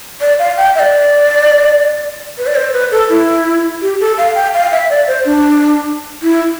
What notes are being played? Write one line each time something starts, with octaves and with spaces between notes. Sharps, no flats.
D5
F5
G5
E5
D5
B4
D5
C5
B4
A4
E4
G4
A4
F5
G5
F5
E5
D5
C5
D4
E4